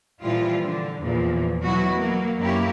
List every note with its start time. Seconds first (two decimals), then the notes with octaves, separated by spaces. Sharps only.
0.22 A#2 E3 F3 G3 E4 F4
0.63 D3
1.00 E2 A#2 E3 F3
1.64 B2 F#3 E4 F#4
1.94 F#3 A#3
2.39 F#2 A#3 B3 E4 G4 C#5